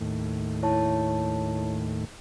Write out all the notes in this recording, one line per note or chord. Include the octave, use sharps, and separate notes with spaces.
D#2 A2
E4 C#5 A5